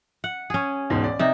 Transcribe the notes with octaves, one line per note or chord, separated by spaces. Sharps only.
F#5
C#4 G#4
E1 G#2 B2
D5
C3 D#4 E5